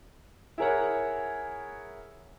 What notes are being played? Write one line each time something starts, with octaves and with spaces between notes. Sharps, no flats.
E4 G#4 A#4 C#5 F#5